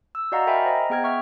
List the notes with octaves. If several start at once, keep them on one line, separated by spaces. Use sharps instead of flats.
E6
F#4 D5 D#5 F5 F#5 A#5
A#4 E5 G5 G#5 B5
C5 D#5 A#5
B3 G#4 G5 F6 G#6
E5 C#6 F6